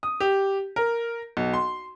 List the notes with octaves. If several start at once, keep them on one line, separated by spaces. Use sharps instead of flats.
D#6
G4
A#4
B1
C6